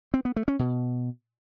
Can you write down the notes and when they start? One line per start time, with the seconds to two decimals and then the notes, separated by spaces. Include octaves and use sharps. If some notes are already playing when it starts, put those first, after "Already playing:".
0.14 C4
0.25 B3
0.36 A3
0.48 C#4
0.59 B2